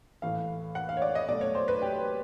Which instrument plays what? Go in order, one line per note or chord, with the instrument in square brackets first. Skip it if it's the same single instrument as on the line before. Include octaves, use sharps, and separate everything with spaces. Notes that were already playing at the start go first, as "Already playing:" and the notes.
[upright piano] A2 E3 A3 F5
F#5
F5
C#5
D5
D#5
B2 F#3 A3 D5
C#5
C5
B4
G4